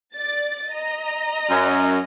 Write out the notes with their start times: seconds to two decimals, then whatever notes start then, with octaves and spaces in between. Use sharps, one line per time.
0.14 D5 A6
0.70 D#5 A#5
1.50 F#2